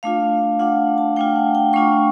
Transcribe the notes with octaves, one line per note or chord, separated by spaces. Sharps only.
A3 D4 F4 F5
A3 D4 F4 F#5
A5
A3 D4 F4 G5
F#5
G5
A3 D4 F4 C#6